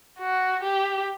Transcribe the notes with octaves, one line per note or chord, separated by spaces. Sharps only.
F#4
G4